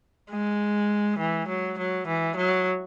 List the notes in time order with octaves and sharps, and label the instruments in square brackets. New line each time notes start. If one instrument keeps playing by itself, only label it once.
[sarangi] G#3
E3
F#3
F#3
E3
F#3